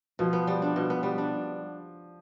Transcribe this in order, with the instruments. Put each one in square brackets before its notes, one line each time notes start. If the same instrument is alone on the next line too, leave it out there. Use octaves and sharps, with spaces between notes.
[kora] B2 [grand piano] F3
[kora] B3
G3
D4
B2
B3
G3
D4